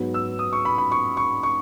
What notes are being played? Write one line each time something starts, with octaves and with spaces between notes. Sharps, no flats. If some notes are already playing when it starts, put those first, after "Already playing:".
Already playing: G#2 F#3 B3
E6
D#6
C#6
B5
B5
C#6
C#6
C#6